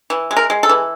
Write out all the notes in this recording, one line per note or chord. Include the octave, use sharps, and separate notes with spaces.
E3
G#3
A#4
G#3
A4
E3